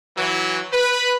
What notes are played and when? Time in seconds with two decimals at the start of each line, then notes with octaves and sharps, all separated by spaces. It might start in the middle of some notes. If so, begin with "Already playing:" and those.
0.18 E3 F#3
0.73 B4